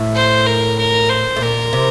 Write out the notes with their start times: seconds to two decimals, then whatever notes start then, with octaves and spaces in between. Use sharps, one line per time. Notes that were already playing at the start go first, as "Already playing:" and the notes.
Already playing: A2
0.15 C5
0.46 A#4
0.79 A#4
1.09 C5
1.36 A2
1.41 A#2 A#4
1.73 C3